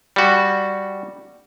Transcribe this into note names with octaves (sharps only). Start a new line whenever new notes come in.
G3 F#4